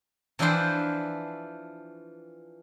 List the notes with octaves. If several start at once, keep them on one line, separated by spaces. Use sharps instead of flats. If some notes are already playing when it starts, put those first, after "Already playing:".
E3 F3 D4 E4 B4 C5